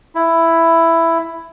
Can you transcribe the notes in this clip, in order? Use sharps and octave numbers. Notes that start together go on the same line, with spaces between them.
E4